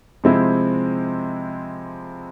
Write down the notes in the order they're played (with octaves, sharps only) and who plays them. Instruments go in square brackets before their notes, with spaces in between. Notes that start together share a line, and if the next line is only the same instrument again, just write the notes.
[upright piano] C3 F3 G#3 C4 E4